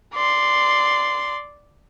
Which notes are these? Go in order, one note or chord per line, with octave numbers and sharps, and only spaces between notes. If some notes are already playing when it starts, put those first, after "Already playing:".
D5 C6